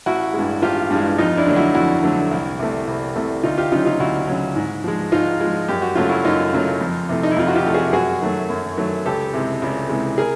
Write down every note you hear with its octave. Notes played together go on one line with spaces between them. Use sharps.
A1 E4 F#4
G2 E3 G#3
A1 F4 G4
G2 E3 G#3
F2 D#4 F4
D4 E4
D3 F#3 A3
E4 F#4
F2 E4 F#4
D3 F#3 A3
C2
C3 E3 A3
C2
C3 E3 A3
D2 D#4 F4
F4 G4
C#3 F#3 D#4 F4
D#4 F4
D2 E4 F#4
C#3 F#3
G#2
F3 G#3
G#2 D#4 F4
F3 G#3
F#2 G4
F#4
C#3 F#3 A3 F4
E4 F#4
F#2 D#4 F4
C#3 F#3 A3
F2
C3 E3 A3
D#4
E4
F2 F4
F#4
F4 G4
C3 E3 A3
F#4 G#4
F#2 F#4 G#4
D#3 F#3 A3
F#2
D#3 F#3 A3
C#2 G4 A4
C3 E3 G#3
C#2
C3 E3 G#3
G#4 A#4